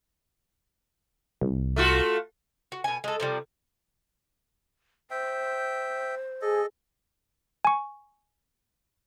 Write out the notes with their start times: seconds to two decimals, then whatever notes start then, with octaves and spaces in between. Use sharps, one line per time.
1.41 C2
1.76 A3 F4 F#4
2.72 F#4
2.84 B2 G#5
3.04 G#3 A4
3.20 C3 F3 G3
5.11 C5 E5 G5
6.42 G#4 A4 D#5
7.65 G#5 C#6